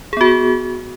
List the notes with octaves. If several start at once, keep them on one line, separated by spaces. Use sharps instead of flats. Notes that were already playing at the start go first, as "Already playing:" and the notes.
B3 F#4 G#4